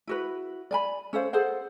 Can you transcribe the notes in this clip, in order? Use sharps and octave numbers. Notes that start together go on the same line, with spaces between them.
E4 F#4 B4
D5 G#5 B5
C#4 A4 C5 F5
G#4 A4 C5 F#5